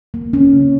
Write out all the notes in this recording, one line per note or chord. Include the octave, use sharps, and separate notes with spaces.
A#3
C#4
C#3